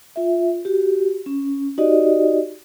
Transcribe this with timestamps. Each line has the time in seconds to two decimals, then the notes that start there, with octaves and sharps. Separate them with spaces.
0.16 F4 E5
0.65 F#4 G4
1.26 C#4
1.78 D#4 F#4 G4 D5 D#5